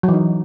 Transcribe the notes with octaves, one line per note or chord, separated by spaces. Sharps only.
F#3
E3
D#4